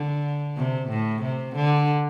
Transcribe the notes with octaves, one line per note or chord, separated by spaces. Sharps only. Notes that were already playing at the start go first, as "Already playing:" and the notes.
Already playing: D3
C3
A2
C3
D3